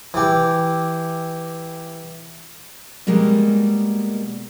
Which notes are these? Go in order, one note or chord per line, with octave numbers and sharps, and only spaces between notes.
E3 G4
B2 G3 G#3 A#3